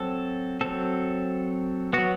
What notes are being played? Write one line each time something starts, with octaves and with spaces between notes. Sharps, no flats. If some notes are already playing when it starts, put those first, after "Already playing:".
Already playing: F#3 C4 A4
F#3 C4 A4
F#3 B3 F#4